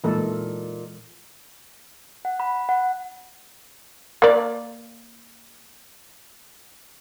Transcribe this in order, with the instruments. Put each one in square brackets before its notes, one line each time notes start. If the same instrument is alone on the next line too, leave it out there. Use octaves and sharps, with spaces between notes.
[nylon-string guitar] A#2 D#4 [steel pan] E3 G#3 A4
[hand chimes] F#5
B5
F#5
[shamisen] A#3 D5